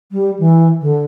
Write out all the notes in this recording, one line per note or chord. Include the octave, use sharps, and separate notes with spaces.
G3
E3
D3